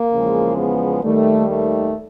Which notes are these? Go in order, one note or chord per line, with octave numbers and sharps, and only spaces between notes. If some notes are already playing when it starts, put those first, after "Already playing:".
Already playing: A#3
E2 C#3 F3 G#3
B3
D#2 D#3 G3 A3
A3